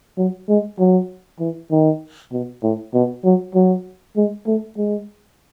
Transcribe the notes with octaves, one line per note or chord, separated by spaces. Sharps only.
F#3
G#3
F#3
E3
D#3
B2
A2
B2
F#3
F#3
G#3
A3
G#3